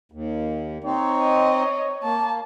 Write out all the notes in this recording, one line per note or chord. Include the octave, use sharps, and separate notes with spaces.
D#2
C4 D#4 C#5
D#5
A#3 A5